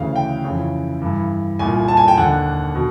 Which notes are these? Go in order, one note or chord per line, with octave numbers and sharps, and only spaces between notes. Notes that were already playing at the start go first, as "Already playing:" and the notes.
Already playing: D2 C#3 E3 F5
G5
F2 C#3 E3
G2 E3
C2 A#2 G#5
A5
G#5
G5
D#2 D3 F#5
B2